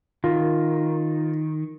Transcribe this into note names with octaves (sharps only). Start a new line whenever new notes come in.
D#3 F4